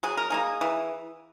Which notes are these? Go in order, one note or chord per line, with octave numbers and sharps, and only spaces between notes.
F#3 G#4
A#4
A#3 D#4 G#4
E3